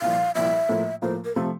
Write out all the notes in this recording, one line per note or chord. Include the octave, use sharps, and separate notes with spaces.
C2 A#2 F3 F5
C2 A#2 F3 E5
A2 F3 A#3 F4
A2 F3 A#3 F4 C5
A#4
C3 F3 A3 A4